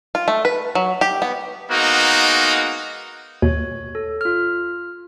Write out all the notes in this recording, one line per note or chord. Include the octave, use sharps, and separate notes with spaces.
F4
A3
B4
F#3
G4
B3
G#3 A#3 B3 D#4 F#4
D#2 B2 C#5
A4
F4 F6